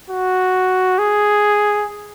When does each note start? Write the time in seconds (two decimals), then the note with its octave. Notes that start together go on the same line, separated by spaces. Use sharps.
0.10 F#4
0.99 G#4